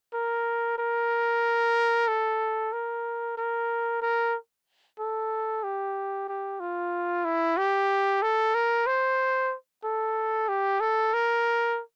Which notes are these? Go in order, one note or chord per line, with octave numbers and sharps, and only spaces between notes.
A#4
A#4
A4
A#4
A#4
A#4
A4
G4
G4
F4
E4
G4
A4
A#4
C5
A4
G4
A4
A#4